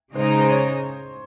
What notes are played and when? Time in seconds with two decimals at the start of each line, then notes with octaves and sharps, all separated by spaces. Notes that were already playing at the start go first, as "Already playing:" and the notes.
0.15 C#3 G#3 D#4 C5
0.39 C5
0.50 C#5